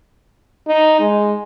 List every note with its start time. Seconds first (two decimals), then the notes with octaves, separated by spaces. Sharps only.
0.67 D#4
1.00 G#3